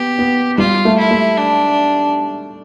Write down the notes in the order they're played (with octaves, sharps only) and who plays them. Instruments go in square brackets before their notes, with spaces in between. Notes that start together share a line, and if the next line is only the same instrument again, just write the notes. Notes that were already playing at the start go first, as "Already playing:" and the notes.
Already playing: [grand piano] B3 [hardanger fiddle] G4
[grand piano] B3
[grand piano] G3 [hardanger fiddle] F4
[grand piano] A3
[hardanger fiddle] E4
[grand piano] A3
[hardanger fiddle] D4